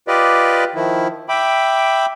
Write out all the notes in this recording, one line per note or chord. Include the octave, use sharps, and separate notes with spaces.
F4 G4 B4 D5 D#5
D#3 F3 E4
E5 G5 B5 D6